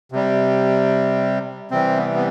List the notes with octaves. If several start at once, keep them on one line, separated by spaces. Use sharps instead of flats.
C3 G3
C3 E3 G3 C4
B3
B3